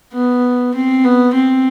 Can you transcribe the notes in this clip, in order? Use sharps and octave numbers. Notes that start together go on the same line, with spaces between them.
B3
C4
B3
C4